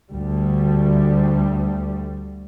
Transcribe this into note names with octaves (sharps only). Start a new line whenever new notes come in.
D2 G3